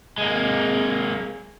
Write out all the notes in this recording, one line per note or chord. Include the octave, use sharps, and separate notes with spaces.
G#3 A#3